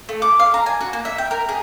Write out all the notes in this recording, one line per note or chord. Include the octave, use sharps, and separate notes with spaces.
A3
D6
F5
A#5
G#5
F#4
A#3
E5
G5
A#4
G#4